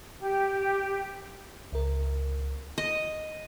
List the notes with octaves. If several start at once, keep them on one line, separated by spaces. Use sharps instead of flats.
G4
C#2 A#4
D#5